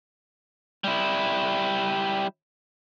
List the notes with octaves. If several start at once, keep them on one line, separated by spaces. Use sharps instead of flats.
G3 E4